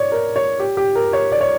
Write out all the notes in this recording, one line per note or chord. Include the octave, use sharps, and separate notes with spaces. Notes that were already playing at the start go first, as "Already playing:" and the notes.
Already playing: C#5 D5
A#4
C#5
G4
G4
A#4
C#5
D5
C#5